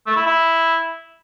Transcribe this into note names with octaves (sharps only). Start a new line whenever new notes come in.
A3
E4
E4